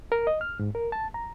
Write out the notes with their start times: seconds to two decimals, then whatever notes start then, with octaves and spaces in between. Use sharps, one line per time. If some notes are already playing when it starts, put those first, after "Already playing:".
0.12 A#4
0.27 D#5
0.41 F6
0.59 G#2
0.75 A#4
0.92 A5
1.14 A#5